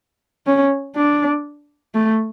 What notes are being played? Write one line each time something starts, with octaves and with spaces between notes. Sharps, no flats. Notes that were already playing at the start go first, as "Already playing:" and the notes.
C#4
D4
A3